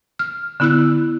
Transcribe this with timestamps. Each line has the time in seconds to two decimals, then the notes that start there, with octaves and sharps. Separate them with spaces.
0.19 F6
0.60 D3 B3 E4 E6 F#6